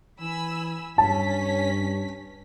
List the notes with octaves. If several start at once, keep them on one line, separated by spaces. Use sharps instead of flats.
E3 G#5 B5 E6
G2 C#4 A5 B6